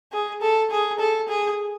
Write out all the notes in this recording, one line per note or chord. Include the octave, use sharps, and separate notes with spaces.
G#4
A4
G#4
A4
G#4